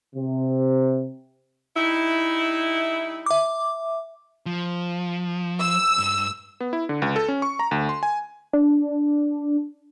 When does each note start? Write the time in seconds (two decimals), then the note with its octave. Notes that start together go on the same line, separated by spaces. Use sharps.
0.15 C3
1.76 G3 D#4 E4
3.26 E5 D6
4.46 F3
5.60 E6
5.98 G2
6.61 B3
6.73 E4
6.89 D3
7.02 C#2
7.16 A4
7.28 C#4
7.42 C#6
7.59 A#5
7.71 D2
7.89 C6
8.03 G#5
8.53 D4